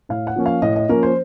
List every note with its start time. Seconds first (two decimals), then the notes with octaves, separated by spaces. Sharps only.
0.09 A2 F5
0.27 F#5
0.36 F3 A#3 C#4
0.46 F5
0.62 A2 D#5
0.76 D#5
0.89 F3 A#3 C#4 A#4
1.03 C5